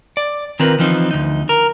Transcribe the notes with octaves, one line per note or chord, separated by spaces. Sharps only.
D5
D#3 C4 F4 A#4 B4
E3 F3 C4 D#4
D2 D#4
A#4